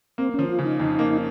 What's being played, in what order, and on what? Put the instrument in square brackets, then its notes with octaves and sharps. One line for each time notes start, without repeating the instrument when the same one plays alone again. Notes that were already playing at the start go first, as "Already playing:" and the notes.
[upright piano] A#3 [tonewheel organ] C4
[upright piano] F3 [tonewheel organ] C#4
[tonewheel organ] F4
[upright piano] C#3
[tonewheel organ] D#4
[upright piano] F2
A#3